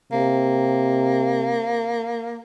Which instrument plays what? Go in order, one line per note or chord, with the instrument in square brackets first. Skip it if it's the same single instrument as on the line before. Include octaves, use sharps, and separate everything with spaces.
[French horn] C3 [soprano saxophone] A#3